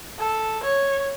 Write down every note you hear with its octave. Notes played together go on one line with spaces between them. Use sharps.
A4
C#5